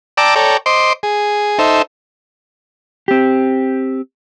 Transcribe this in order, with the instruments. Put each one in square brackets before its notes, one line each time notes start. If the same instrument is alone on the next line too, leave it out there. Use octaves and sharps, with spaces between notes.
[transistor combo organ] D5 G5 A5 A#5 D6 E6
A4 C#5 D5 G5 A#5
C5 D#5 C6 D6
G#4
D#4 A4 C5 E5
[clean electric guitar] C4 G4